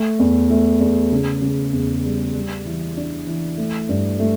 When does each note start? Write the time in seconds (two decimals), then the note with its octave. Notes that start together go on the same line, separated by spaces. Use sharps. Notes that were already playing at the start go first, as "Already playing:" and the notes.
Already playing: A3
0.19 E2
0.50 A3
0.81 E2
1.12 C#3
1.42 C#3
1.73 E2
2.04 G3
2.34 G3
2.65 E3
2.97 D4
3.27 E3
3.58 A3
3.89 G2
4.20 A3